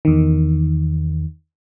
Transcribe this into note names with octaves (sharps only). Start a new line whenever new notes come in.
E2 D#3